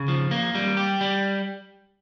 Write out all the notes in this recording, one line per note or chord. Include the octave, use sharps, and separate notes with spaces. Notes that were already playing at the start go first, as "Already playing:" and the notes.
Already playing: C#3
F3
A#3
G3
G4
G3